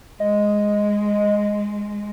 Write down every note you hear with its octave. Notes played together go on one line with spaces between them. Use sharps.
G#3 D#5